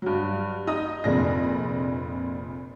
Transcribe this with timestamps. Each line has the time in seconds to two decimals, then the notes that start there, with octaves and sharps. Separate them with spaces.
0.02 G2 F#3
0.67 D#4 D#5 D#6
1.04 F1 F2 A#2 D4 G#4 A#6